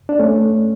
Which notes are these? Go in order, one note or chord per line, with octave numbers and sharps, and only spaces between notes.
D4
A3 C#4